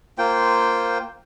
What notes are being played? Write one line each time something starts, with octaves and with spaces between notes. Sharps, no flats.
A#3 F4 C5 G5